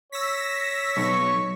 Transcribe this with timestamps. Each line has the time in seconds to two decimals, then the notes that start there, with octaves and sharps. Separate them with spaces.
0.12 C#5 E6 A#6 B6
0.97 B1 C#6